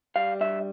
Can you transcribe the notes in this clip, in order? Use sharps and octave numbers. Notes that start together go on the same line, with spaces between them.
G3 F5
G2 E5